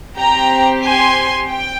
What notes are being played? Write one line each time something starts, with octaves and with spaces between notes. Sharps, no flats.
C4 G4 G5 A#5
G#5 C6
G5